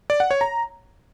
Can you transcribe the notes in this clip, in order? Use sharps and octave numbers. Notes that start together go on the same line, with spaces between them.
D5
F#5
C#5
A#5